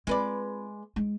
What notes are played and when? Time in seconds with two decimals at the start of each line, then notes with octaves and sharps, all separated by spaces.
0.07 G#3 C4 F4 B4 D5
0.96 G#3 D#4